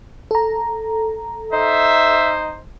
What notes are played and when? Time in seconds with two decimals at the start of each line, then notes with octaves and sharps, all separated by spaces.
0.31 A4 A#5
1.53 D#4 C5 E5